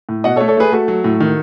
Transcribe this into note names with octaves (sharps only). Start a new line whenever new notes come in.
A2
B2 D#5 F#5
A4 C#5
A3
A4 C#5
A3 G#4 B4
A3 F#4 A4
F#3
A2
D#3